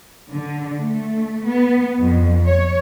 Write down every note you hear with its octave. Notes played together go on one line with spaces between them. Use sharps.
D3
A3
B3
F2
C#5